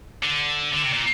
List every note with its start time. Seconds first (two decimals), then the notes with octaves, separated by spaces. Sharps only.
0.24 D3
0.73 D3
0.83 C3
0.93 A#2